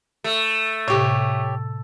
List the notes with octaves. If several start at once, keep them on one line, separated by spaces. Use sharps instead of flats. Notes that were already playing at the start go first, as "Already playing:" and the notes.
A3
A2 C3 G4 C#5